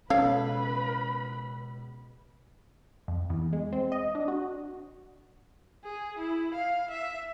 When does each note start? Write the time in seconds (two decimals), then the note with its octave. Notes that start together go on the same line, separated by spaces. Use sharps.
0.10 C#2 B2 C#4 A4 B4 C#5 F5 B5
3.08 F2
3.30 E2
3.53 G#3
3.73 C4
3.92 D#5
4.15 D4
4.28 F#4
5.84 G#4
6.18 E4
6.54 F5
6.90 E5